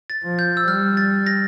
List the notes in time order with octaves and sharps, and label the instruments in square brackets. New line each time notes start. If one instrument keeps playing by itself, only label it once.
[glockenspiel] A6
[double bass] F3
[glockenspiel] G6
E6
[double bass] G3 [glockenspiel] F6
[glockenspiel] A6
A#6